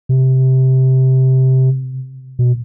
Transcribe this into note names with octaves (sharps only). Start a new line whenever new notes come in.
C3
B2